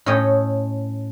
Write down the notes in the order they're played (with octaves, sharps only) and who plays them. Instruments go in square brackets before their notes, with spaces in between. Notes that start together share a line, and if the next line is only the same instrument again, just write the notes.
[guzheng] A2 A3 C#4 C#5 D#5 G5